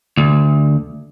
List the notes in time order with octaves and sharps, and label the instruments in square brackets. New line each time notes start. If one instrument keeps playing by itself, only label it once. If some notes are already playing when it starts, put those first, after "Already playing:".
[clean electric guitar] D2